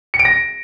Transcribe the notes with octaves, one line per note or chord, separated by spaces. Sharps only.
C#7
D7
A#6